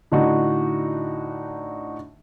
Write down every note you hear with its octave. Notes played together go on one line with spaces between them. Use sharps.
A2 D3 D4 D#4 F#4